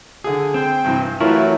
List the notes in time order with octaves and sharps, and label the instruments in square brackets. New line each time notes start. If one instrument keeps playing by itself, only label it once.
[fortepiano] D3 G#4
[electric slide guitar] C4 [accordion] G5
[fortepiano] G2 C3 E3
[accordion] E3 F#3 A3 [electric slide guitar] E4 [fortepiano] F4 A#4 C#5